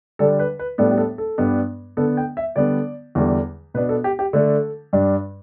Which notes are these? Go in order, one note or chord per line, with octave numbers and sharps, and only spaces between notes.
D3 G3 D4 A4
B4
B4
A2 G3 B3 D4 A4
G4
A4
A4
G2 G3 B3 D4
D3 B3 D4 A4
G5
E5
D3 G3 B3 D4 D5
E2 D3 G3
B2 B3 D4 B4
A4
G4
G4
D3 A3 D4 A4
G2 G3 D4